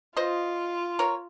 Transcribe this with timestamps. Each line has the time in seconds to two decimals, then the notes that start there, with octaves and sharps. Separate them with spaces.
0.17 F4 C5 D#5
0.99 A#4 C#5